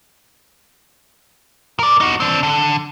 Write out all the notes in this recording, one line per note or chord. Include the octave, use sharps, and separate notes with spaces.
A#4 D5
D#4 F#4
C4 D4
D3